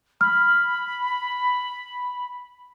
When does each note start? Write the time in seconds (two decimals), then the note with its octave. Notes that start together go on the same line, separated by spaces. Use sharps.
0.21 B5 F6